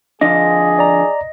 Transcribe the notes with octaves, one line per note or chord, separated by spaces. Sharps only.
D3 F3 D4 G#4 D#5
D5 A#5